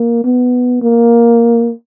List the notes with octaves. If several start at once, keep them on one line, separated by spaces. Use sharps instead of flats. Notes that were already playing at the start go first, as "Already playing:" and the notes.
Already playing: A#3
B3
A#3